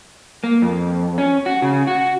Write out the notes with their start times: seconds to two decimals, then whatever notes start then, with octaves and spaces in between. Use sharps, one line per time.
0.44 A#3
0.62 F2
1.18 C#4
1.46 F#4
1.62 C#3
1.87 F#4